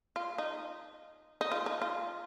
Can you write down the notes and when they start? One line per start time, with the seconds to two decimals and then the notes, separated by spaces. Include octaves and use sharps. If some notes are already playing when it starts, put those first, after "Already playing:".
0.16 F4
0.38 D#4
1.41 D#4
1.52 F4
1.66 D#4
1.82 F4